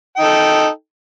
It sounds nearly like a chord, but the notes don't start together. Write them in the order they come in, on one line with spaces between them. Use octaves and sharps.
G5 D#4 A4